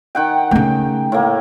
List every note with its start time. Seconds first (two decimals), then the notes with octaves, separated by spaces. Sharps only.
0.15 D#3 F#5 G5
0.51 C#3 A3 G5
1.12 A2 A#3